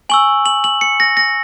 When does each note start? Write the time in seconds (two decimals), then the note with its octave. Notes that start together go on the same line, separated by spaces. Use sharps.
0.09 G#5 C#6 E6 F#7
0.46 F#7
0.64 F#7
0.81 C#7
1.00 A#6
1.17 A#6